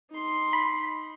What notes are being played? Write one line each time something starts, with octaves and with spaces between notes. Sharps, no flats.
D#4 C6
B5